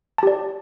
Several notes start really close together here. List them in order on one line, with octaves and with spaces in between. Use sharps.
A5 G4 D5